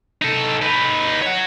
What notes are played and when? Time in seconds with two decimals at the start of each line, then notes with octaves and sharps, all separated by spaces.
0.22 D#4 A4
0.61 D#4 B4
1.22 C#5 F#5